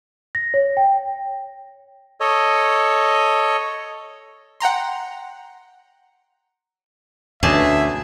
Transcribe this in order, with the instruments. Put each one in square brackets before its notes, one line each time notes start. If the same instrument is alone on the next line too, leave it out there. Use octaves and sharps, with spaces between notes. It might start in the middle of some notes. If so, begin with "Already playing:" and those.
[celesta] A#6
C#5
G5
[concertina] A4 C#5 D#5
[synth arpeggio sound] F#5 G5 A#5 C6
[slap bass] D2 [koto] B2 G#4 A5 [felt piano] D3 C#4 D6 [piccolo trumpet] E5